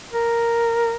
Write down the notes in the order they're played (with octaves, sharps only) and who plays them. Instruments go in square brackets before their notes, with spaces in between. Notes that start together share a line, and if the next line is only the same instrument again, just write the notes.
[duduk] A#4